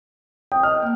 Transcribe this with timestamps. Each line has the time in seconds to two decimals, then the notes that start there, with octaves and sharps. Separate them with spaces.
0.52 G5 D#6
0.63 D#5 F6
0.82 A#3 G5